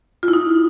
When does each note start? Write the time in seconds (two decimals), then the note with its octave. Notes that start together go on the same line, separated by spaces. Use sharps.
0.23 F4
0.28 E4
0.33 D#4